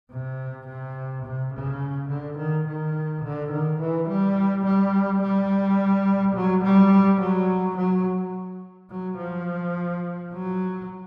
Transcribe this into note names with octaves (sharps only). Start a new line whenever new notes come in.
C3
C3
C3
C#3
D3
D#3
D#3
D3
D#3
E3
G3
G3
G3
F#3
G3
F#3
F#3
F#3
F3
F#3